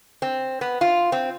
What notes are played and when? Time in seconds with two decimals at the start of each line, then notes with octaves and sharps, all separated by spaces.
0.22 C4
0.61 B3
0.81 F4
1.12 C4